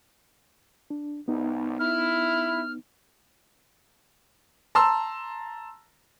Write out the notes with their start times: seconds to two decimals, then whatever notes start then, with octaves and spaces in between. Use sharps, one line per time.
0.90 D4
1.28 C2 B3 D#4
1.79 E4 F6
4.75 A5 A#5 C6 E6